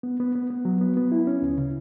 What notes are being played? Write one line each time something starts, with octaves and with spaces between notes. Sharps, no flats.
B3
B3
B3
B3
F#3
B3
B3
E4
C#4
D2
C#3